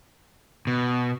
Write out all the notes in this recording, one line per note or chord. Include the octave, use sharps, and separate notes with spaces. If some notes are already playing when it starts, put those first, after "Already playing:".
B2